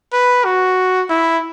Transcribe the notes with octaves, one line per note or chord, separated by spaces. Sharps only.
B4
F#4
E4